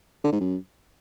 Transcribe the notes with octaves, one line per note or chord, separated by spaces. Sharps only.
D3
G#2
F#2